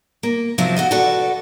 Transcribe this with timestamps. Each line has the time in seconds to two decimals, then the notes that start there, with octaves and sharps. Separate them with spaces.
0.23 A#3
0.58 C3 F3 F#3 C4
0.76 F#4 A4 D#5
0.91 F#4 A4 B4 D5